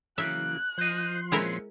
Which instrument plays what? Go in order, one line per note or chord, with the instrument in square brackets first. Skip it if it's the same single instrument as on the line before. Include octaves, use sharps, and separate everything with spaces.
[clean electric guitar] C#3 F#3 A#3 [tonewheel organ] E3 [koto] E5 [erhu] F#6
[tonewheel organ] F3 C6 [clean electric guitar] C5 D#5
[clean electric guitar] A#2 C4 C#4 [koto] G#3 E4 A#4